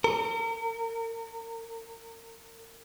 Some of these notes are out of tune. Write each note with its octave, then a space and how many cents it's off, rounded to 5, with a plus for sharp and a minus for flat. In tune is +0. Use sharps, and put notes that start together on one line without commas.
A#4 -35